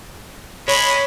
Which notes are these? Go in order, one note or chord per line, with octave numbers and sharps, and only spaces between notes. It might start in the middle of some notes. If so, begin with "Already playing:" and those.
G#3 C#5 B5